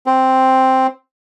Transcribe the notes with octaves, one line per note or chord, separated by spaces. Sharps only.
C4